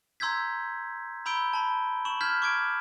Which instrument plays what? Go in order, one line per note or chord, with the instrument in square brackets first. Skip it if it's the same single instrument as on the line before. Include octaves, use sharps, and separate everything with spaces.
[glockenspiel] A#5 C6 E6 G6 G#6 B6
A#5 B5 E6 G6 D7 G7
A5 B5
C#6 E7 F#7
F6 G6 G#6 B6
C#6 D6 G#6 D7